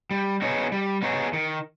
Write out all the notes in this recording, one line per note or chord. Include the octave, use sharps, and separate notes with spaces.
G3
B3 D#4 G#4 C#5
G3
B3 D#4 G#4 C#5
D#3